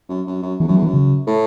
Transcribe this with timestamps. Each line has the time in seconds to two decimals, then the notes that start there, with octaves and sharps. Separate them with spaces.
0.09 F#2
0.27 F#2
0.42 F#2
0.60 E2 E3
0.68 F#2
0.70 F#3
0.76 E2
0.83 F#2 E3
0.94 C#3
1.27 A2